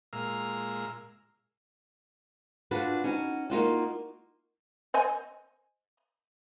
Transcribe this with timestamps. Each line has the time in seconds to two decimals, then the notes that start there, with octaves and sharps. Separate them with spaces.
0.13 A#2 G#3 F5 A#5 E6
2.71 D4 F4 F#4 B4
3.04 C#4 D#4 F#4
3.50 A#3 D#4 F4 F#4
4.94 C5 D#5 G#5